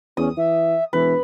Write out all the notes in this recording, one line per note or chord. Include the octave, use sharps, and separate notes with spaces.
E2 C#4 D#6
E3 E5
E1 E3 B4